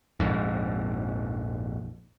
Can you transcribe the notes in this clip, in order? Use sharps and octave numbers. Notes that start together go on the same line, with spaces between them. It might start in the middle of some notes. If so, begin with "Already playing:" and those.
A#1 F2 G#2